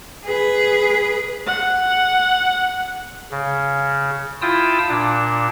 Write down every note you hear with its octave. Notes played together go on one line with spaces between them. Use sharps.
G#4 B4
F#5
C#3
E4 F4 G5 A5 D#6 E6
A#2 D4